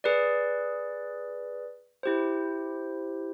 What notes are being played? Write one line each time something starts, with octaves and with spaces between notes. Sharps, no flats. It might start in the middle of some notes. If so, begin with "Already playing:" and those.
G#4 B4 D5
E4 G4 C5